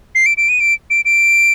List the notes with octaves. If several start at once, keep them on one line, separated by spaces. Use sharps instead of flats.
C7
D7
D7
D#7
D7
D7
D7